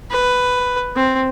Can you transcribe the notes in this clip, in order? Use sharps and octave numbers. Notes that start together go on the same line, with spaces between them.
B4
C4